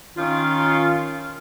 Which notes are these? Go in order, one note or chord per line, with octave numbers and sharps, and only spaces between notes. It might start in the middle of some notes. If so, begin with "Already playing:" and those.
D#3 C#4 F4